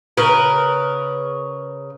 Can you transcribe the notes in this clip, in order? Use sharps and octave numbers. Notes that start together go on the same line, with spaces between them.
C#3 A#4 B4